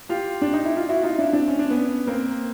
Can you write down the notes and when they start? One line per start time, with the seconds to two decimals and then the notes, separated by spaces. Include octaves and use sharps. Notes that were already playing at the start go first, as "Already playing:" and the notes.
0.09 F4 G4
0.41 D4
0.53 D#4
0.65 E4
0.77 F4
0.89 E4 F#4
1.03 D#4 F4
1.18 D4 E4
1.33 C4 D4
1.48 C#4
1.59 D4
1.70 B3 C#4
2.07 A#3 C4